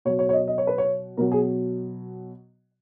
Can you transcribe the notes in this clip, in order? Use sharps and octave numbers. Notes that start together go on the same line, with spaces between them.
B2 F#3 C#5
C#5
C#5
D#5
D#5
C#5
B4
C#5
B2 F#3 A#4
G#4